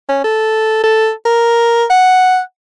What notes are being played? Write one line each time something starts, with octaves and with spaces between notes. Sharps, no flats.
C#4
A4
A4
A#4
F#5